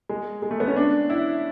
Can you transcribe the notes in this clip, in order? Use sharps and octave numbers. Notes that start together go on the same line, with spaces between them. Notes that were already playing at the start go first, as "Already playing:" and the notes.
G#3
G#3
A3
B3
C#4
D4
E4